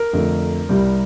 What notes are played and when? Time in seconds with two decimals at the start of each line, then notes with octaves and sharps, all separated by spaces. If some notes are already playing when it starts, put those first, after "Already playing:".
Already playing: A#4
0.13 F2 D3 A3 D4
0.69 C2 C3 G3